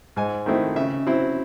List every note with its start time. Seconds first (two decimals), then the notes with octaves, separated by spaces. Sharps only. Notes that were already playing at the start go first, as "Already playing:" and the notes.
0.16 G#2 G#5
0.46 D#3 A3 C4 E4
0.76 C#3 E5
1.07 F#3 C4 E4